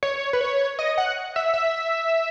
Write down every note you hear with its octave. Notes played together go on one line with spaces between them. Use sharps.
C#5
B4
C#5
D#5
F#5
E5
E5